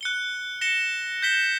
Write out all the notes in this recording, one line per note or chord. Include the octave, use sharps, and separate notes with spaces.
F#6 C#7 G7
A#6 C#7 E7 G7
G6 B6 E7 G7